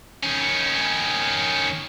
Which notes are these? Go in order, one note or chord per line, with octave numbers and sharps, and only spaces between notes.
D#3 C#4